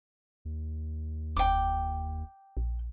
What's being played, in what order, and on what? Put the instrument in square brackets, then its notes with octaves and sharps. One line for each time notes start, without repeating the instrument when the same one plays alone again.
[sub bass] D#2
[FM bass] F1 [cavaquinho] G5 D6
[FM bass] A#1